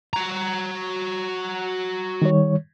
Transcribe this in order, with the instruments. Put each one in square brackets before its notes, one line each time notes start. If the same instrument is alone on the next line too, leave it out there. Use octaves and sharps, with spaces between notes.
[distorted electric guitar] F#4 A#5
[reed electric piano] D#3 G3 C#5